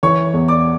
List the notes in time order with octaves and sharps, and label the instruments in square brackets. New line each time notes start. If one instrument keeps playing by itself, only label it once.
[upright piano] E3 [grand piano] C#5 C#6
[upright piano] E2
[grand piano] D5 D6